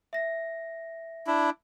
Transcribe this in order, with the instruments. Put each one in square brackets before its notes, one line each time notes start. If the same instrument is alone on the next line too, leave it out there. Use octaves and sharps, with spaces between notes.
[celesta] E5 A#6
[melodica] D4 E4